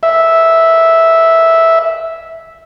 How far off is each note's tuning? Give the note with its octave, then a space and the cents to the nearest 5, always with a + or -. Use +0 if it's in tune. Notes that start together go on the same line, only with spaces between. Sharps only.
E5 -5